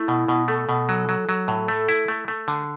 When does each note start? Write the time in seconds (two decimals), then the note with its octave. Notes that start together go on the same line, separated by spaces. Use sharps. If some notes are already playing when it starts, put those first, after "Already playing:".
Already playing: A3 E4
0.08 B2
0.28 B2
0.48 A3 A4
0.69 B2
0.89 F#3
1.09 F#3
1.29 F#3
1.48 A2
1.68 A3
1.89 E4
2.08 A3
2.28 A3
2.48 D3